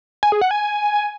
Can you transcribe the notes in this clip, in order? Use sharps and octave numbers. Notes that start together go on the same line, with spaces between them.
G#5
G#4
F#5
G#5